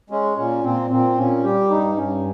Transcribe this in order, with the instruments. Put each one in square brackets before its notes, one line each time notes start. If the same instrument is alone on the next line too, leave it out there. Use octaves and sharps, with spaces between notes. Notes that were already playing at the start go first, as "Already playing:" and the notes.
[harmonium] G#3 C#4
A#2 C#4
A#2 C4
A#2 C4
A#2 C#4
G3 G4
G2 D#4
G2 C#4